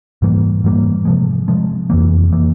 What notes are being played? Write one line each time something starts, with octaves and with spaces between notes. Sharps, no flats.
G#2 E3 G3 A#3
G#2 E3 G3 A#3
C3 F3 G#3
C3 F3 G#3
F2 E3 A#3
E3 A#3